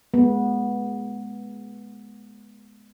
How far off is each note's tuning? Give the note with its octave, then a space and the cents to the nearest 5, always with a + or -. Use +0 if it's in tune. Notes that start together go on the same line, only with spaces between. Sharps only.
G#3 +15 B3 -15